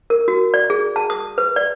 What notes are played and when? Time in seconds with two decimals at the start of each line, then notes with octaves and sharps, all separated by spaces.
0.10 A#4
0.28 F#4
0.54 D5
0.70 G#4
0.96 A5
1.10 D#6
1.38 B4
1.56 D5